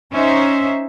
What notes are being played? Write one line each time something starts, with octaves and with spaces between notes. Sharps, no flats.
C#4 D#4 C5 E5